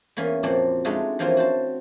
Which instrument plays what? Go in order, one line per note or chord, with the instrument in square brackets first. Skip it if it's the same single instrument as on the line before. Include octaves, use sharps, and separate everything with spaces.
[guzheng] E2 A#3 B3 C#4 F5
F2 A#2 C4 F#4 D5 A5
G#3 A3 D4 D#4 F4 F#4
E3 F3 A#3 C4 C#4 F4
F#4 C5 A5